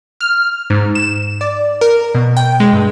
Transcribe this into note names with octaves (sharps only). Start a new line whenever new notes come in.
F6
G#2
E7
D5
A#4
B2
G5
G#3
G2